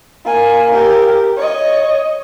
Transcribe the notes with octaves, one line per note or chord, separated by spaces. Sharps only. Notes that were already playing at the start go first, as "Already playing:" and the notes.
A#3 G#5
G4 A#4
C#5 D#5